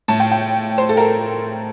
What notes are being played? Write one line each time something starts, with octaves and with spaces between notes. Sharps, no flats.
A2 A5
G5
G5
C5
A4
A#4
A4